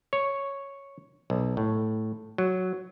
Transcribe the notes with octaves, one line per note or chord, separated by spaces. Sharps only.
C#5
B1
A2
F#3